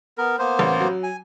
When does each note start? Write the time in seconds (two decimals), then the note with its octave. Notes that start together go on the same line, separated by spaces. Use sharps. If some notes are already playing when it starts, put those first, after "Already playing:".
0.18 B3 A#4
0.39 A#3 B3 C5
0.59 A1
0.80 F#3
1.03 G#5